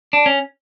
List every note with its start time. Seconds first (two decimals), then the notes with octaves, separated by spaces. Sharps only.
0.13 D4
0.26 C#4